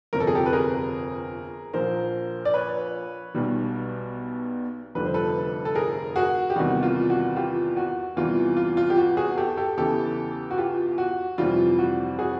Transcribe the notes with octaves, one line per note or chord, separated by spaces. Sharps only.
G1 F2 C3 A#4
A4
G#4
G4 A4
B4
G#4 A#4
A#1 A#2 F3 A#4 C5
D5
B4 C#5
B1 B2 G3
F1 F2 D3 G3 B4
C5
A4 B4
A4
G#4 A#4
F#4 G#4
G4
E2 C3 D#3 G3 F#4
F4
F#4
F4 G4
F#4
E2 C3 E3 G3 F4
F4
F4
G4
F#4
F#4 G#4
G4 A4
G4 A4
E2 C#3 E3 G4 A4
F#4
F4 G4
F#4
F2 C3 E3 G3 F4
F#4
F#4 G#4